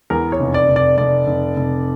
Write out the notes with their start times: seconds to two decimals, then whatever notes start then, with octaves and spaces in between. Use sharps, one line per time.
0.10 E2 A#4
0.32 C#5
0.40 F1
0.54 D5
0.69 F1
0.76 D5
0.98 F1 D5
1.27 F1
1.57 F1